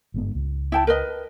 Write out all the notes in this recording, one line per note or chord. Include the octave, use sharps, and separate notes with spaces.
G1 G#2 B3
C#2
E4 G5 A5
A#4 B4 D#5